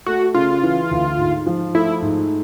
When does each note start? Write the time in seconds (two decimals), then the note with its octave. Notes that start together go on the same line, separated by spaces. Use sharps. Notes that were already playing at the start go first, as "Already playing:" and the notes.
0.06 A3 F#4
0.34 C#3 F4
0.63 E3
0.91 D2
1.18 G#2
1.47 F3
1.75 A3 E4
2.02 G#2